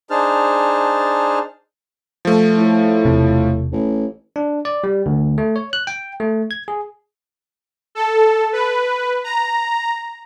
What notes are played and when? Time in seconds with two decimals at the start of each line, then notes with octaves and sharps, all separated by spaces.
0.10 D4 D#4 G#4 C5 A5 F6
2.25 F3 A3
2.58 A2
3.05 E1 C3
3.72 A1
4.36 D4
4.65 D5
4.84 G3
5.06 D2
5.38 A3
5.56 C#5
5.73 F#6
5.87 G5
6.20 A3
6.51 G#6
6.68 G#4
7.95 A4
8.53 B4
9.24 A#5